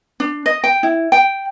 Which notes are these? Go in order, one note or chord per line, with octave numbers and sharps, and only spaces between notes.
D4
D#5
G5
E4
G5